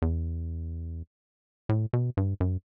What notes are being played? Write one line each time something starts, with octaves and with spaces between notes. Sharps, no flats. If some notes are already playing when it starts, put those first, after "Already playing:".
E2
A2
B2
G2
F#2